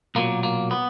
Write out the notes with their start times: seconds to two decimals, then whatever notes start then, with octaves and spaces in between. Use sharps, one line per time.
0.15 B1 A#2 F#3 A#3
0.43 A#3
0.71 B3